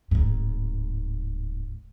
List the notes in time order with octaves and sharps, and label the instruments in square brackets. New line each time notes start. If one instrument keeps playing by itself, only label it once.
[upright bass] D1 G#2